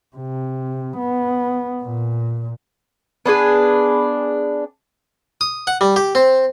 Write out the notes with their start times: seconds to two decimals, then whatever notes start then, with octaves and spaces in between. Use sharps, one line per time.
0.17 C3
0.98 B3
1.82 A#2
3.26 B3 D4 G#4 B4
5.41 D#6
5.67 F#5
5.81 G3
5.96 G4
6.15 C4